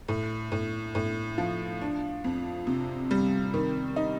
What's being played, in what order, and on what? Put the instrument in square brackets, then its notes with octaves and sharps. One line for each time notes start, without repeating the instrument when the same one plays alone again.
[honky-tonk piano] A2
A2
A2
F3
D4
F2
C3
G3
D#3
D#4